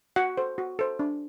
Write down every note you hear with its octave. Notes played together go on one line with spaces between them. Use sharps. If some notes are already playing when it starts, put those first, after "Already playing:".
F#4 F#5
A4 C5
F#4
A4 C5
D4